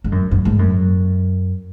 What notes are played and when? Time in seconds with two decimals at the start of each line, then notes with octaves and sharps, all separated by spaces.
0.04 G#2
0.12 F#2
0.31 F#2
0.45 G#2
0.59 F#2